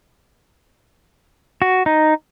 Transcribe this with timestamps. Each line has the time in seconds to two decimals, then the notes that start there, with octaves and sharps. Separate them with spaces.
1.62 F#4
1.86 D#4